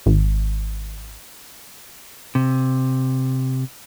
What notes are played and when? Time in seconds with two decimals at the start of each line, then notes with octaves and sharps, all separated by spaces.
0.06 G#1
2.35 C3